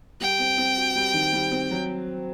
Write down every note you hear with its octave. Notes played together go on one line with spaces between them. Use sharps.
G3 G5
C4
C4
F#4
G3
D#3
G3
C4
F#3